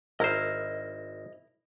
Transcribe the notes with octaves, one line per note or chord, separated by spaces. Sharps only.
G#1 E4 A#4 C5 D#5 F6